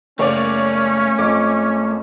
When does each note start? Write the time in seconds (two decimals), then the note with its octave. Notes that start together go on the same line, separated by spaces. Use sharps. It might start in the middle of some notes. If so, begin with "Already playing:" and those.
0.19 F#1 A3 A#3 C#4 C#5 D5
1.18 F2 D6